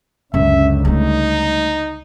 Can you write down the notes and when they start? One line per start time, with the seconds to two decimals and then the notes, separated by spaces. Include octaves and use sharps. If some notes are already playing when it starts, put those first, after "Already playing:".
0.34 C#2 F#2 D3 E5
0.85 G3 A3 D#4